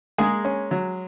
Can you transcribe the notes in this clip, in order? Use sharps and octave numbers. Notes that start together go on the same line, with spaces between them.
G#3 A#3 G#4
C#4
F#3